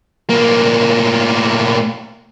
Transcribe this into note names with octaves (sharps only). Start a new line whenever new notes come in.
A2 A#3